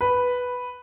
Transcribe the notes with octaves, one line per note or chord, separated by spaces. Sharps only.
B4